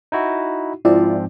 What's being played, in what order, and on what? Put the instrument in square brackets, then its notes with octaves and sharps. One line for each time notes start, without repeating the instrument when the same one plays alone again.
[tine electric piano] D#4 E4 F#4
[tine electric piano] G#2 F3 C4 [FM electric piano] E4 F4 D5